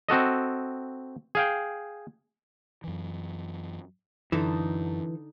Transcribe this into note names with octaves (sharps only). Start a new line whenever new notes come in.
C4 F#4 A4 D#5
G#4 F5 G5
F#2 E3
F#2 D3 E3 D#4 A4